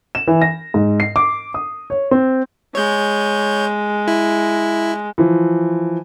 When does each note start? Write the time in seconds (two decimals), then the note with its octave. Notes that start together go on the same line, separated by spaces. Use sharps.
0.15 E7
0.27 E3
0.42 A#6
0.74 G#2
1.00 C7
1.16 D6
1.54 D#6
1.90 C#5
2.11 C4
2.75 G#3 C#5 G6
4.08 E4
5.18 E3 F3